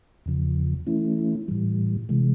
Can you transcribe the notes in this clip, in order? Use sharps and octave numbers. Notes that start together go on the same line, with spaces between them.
E2 C#3 F3
E3 A3 C#4 E4
A2 E3 G3
C3 E3 G#3